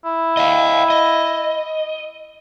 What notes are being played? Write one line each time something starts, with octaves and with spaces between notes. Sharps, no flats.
E4
D#5 F5
D#5